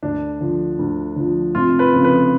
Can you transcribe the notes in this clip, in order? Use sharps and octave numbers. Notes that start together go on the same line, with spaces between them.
D2 D4
D3 F3
D2
D3 F3
F1 F4
B4
F2 C#3 F3
B4